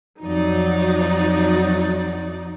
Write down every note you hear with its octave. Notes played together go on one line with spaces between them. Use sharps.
F2 F#3 D#4 D5